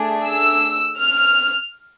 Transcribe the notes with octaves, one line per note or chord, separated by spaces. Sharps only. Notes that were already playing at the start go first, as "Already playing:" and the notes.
Already playing: A3 D4 G#4
E6
F6